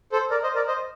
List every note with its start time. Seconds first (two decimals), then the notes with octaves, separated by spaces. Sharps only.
0.12 A4 C5
0.31 A#4 D5
0.43 C5 D#5
0.55 A#4 D5
0.68 C5 D#5